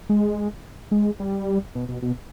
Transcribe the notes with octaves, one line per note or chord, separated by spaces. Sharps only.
G#3
G#3
G3
B2
B2
B2